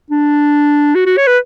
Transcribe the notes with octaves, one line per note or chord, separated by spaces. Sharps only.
D4
F#4
F#4
C#5
B4